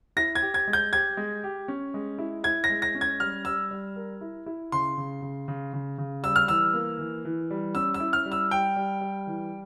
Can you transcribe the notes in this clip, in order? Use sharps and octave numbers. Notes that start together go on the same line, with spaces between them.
E4 A#6
G#6
G4
G#6
G#3
G6
G4 G#6
G#3
G4
C#4
G#3
E4
E4 G#6
A#6
G#3
A#6
C#4
G#6
G3 F6
G3 E6
G3
A#4
E4
E4
C#3 C6
C#3
C#3
C#3
C#3
C#3
G3 E6
F6
E3 E6
A#3
E3
E3
G3
C#4 E6
E6
E4
F6
G3
E6
G3 G5
G3
G3
E3